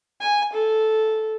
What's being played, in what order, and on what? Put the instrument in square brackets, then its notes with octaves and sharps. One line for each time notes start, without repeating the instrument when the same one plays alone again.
[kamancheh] G#5
A4